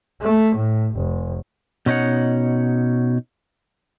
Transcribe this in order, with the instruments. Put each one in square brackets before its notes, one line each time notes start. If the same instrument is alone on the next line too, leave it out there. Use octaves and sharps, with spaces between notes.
[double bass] A3
A2
F1
[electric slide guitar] B2 C#4 D#4 C#5 F#5